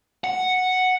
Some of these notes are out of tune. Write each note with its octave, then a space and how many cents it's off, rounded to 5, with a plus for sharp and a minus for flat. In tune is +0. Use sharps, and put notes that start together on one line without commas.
F#5 +0